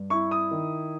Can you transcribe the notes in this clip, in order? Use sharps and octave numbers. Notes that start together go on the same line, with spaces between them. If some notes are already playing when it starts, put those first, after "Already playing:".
Already playing: G2
E4 C#6
D#6
D#3